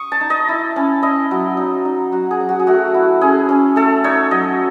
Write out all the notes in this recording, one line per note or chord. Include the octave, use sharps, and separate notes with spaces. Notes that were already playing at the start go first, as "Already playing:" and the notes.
Already playing: C#6 D#6
A5
D#4
D#5
E4
C#4
E4 D#5
F#3
D#4
D#4
F#3 F#4
G#4
F#3
F#4
G#4
A3 F#4
E4
C#4 G#4
C#4
A3 A4
D#4 C#5
F#3 D#5